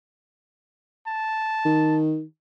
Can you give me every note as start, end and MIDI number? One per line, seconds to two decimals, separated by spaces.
1.07 1.99 81
1.65 2.23 51